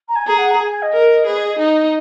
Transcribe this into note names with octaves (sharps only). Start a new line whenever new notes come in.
A#5
G#5
G#4 A#5
F#5
A#5
G#5
G#5
D#5
A#4
G#4 B4
D#5
D#5
D#4